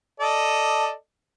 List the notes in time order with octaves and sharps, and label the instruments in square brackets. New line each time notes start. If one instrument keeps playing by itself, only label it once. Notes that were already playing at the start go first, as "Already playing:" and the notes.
[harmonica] A4 D5 D#5